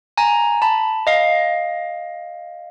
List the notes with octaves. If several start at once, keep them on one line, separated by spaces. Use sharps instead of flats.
G#5 A#5
A5 B5
D#5 F5